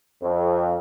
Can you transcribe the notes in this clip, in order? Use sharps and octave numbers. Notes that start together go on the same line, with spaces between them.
F2